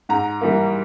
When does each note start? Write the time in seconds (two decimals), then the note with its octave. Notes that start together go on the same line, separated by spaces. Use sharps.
0.09 G#2 A#5
0.41 E3 G3 A#3